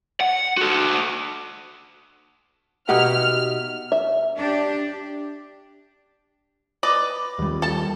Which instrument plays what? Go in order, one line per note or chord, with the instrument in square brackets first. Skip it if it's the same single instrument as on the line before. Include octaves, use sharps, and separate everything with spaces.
[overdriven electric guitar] F#5
F#4 A4
[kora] B2 D#4 E5 [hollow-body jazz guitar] G4 F#5 [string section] F6
[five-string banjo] E5
[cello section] D4 G4
[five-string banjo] B4 D5 D#5
[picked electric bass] D#2 G3
[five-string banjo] A4 A5